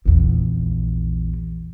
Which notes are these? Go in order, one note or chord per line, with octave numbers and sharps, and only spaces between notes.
A#1 E2